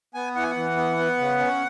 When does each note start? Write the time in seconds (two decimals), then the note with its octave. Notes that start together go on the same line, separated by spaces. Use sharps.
0.14 B3 G#5
0.35 E3 F#5
0.43 G#5
0.51 F#5
0.56 E3
0.77 B3
0.97 B3
1.18 C#3
1.39 C#4